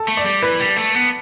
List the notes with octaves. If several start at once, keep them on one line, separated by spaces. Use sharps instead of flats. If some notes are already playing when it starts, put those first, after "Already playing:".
Already playing: A4
A3
D5
G3
E3 B4
G3
A3
B3